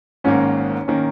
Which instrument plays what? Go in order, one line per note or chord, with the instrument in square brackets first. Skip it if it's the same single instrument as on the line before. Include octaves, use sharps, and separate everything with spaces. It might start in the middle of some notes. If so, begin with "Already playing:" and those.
[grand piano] G#1 G#2 D#3 A#3 [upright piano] C#4
[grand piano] D#3 A#3 [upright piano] C#4